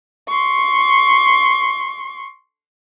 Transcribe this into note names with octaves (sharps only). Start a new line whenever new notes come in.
C6 C#6